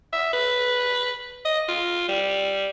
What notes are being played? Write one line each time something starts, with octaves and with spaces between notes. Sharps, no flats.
E5
B4
D#5
F4
G3